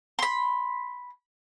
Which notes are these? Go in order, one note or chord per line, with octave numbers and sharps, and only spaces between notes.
B5 C6